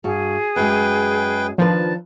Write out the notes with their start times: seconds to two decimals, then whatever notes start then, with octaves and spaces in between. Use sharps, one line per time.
0.04 G2 F#4 G#4
0.56 F#2 G#3 B4 G5
1.58 D#3 F3 D4 B4 A5